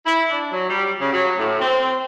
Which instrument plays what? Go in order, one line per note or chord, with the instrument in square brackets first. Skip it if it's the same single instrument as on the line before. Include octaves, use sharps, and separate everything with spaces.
[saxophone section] E4
D4
F#3
G3
C#3
F#3
A2
C4